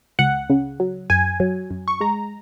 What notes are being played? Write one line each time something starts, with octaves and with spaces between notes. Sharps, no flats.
C#2 F#5
C#3
F#3
F#2 G#5
F#3
F#2
C#6
G#3 A#5